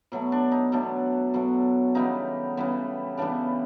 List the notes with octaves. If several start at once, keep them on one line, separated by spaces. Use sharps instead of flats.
B2 F#3 A3
D4
D#4
B2 F#3 A3 D4
B2 F#3 A3
C#3 E3 G3 B3 D#4
C#3 E3 G3 B3
C#3 E3 G3 B3 D4